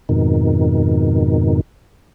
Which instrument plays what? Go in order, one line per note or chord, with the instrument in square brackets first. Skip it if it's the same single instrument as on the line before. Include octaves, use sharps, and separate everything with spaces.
[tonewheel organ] F2 G#2 B2 D#3